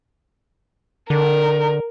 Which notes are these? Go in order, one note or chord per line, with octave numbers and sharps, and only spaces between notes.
D3 A#4